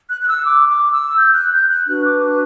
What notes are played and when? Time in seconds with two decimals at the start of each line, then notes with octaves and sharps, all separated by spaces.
0.09 F#6
0.21 F#6
0.27 E6
0.45 D6
0.68 D6
0.92 E6
1.16 G6
1.33 F#6
1.51 G6
1.69 F#6
1.87 D4 F#4 B4 F#6
2.04 D6
2.22 F#6